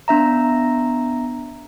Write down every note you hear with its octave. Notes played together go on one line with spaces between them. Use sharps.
B3 D4 E5 A#5